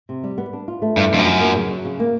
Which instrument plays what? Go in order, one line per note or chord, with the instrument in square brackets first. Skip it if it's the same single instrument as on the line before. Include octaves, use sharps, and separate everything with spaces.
[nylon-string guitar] C3
G3
B3
D4
F4
A3
[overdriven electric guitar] G2 [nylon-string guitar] E3
[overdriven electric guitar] F2 [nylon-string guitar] D4
[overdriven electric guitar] F#2
[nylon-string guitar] F4
A#3
C#3
F#3
C#3
A#3